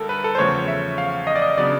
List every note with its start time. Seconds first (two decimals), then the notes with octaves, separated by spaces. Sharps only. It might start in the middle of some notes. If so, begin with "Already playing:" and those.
Already playing: D2 D3 G3 A4 A#4
0.09 B4
0.24 A4
0.35 C5
0.38 E2 C#3 F3 A3 C#5
0.68 E5
0.98 F5
1.27 D#5
1.35 D5
1.42 D#5
1.57 C#3 F#3 B3 D4 D5